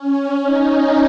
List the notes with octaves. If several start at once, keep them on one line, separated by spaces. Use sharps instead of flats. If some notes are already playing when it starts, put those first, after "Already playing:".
Already playing: C#4
D#4